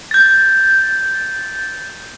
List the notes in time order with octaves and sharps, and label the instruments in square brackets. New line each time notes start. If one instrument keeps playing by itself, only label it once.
[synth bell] G6 A6